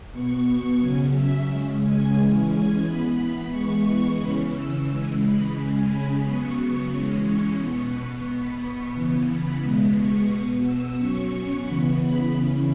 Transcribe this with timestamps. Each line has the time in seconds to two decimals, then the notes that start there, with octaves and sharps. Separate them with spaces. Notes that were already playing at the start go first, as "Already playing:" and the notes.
0.12 B2 B3 C#6
0.79 C#3 F#3 C#4 G#5
1.13 E5
1.47 C#3 G#3 C#4
1.82 G#5
2.16 E3 G#3 C#4
2.49 G#5
2.83 E3 B3 B5
3.51 E3 G#3 B3 C#6
4.18 C#3 E3 C#4 B5
4.53 E6
4.88 C#3 E3 G#3
5.21 B5
5.55 C#3 G#3 C#4 G#5
5.88 B5
6.23 C#3 F#3 B3 C#6
6.90 E3 G#3 C#4
7.25 C#6
7.59 B2 B3 C#6
7.92 C#6
8.26 B2 B3 B5
8.60 C#6
8.94 C#3 E3 B3
9.28 B5
9.61 B2 G#3 B3
9.95 C#6
10.30 B2 B3
10.63 E6
10.97 B2 F#3 C#4 C#6
11.65 C#3 E3 B3 B5
12.00 B5
12.33 C#3 E3 C#4